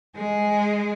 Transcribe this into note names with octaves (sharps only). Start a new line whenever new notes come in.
G#3 G#4